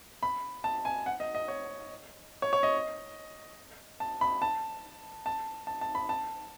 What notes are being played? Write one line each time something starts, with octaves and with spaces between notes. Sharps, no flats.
B5
A5
G#5
F#5
D#5
D#5
C#5
C#5
C#5
D#5
A5
B5
A5
A5
A5
A5
B5
A5